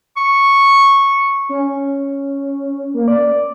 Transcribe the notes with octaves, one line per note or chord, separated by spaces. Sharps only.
C#6
C#4
A#3
D5